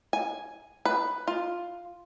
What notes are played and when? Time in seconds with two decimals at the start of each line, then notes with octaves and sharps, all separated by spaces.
0.13 G#5
0.85 B4
1.28 F4